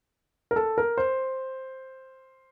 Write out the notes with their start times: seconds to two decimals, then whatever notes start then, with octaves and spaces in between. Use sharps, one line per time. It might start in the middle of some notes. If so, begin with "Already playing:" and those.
0.51 A#4
0.56 A4
0.78 A#4
0.98 C5